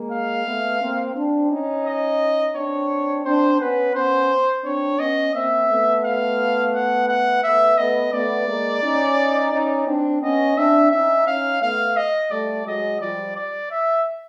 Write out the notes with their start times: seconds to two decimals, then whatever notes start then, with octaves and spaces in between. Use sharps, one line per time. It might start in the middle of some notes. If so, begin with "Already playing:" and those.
Already playing: G#3 A#3
0.12 F5
0.46 A3 B3
0.81 A#3 C4
1.16 C4 D4
1.51 C#4 D#4
1.86 D#5
2.56 C4 D4 C#5
3.25 C4 D4 C5
3.60 B3 C#4 B4
3.95 B3 C#4 C5
4.64 C4 D4 C#5
4.99 B3 C#4 D#5
5.34 A#3 C4 E5
5.69 A3 B3
6.04 F5
6.74 F#5
7.08 F#5
7.44 A3 B3 E5
7.78 A3 B3 D#5
8.13 A3 B3 D5
8.48 G#3 A#3
8.83 C#4 D#4
9.53 C#4 D#4
9.87 C4 D4
10.22 B3 C#4 D#5
10.58 C4 D4 E5
10.92 C#4 D#4 E5
11.27 C#4 D#4 F5
11.61 A3 B3 F5
11.97 D#5
12.31 G3 A3 D5
12.66 F#3 G#3 D#5
13.01 F3 G3 D5
13.36 D5
13.71 E5